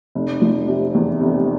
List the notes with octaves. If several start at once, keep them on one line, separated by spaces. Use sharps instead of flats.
F1
F3
C3
E2
F1